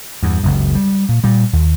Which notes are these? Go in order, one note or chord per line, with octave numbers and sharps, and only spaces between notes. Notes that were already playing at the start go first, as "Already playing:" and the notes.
E2 G2
F#1 C#2 F#2
G3
A#2
A#2 G3
D#2